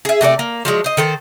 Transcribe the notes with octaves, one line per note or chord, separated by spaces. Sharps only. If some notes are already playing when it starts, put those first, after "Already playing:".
G#4 E5
C3 A3 G#4 D5
A#3
F3 F#3 G#3 D4
C5 D#5
D#3 A4 C5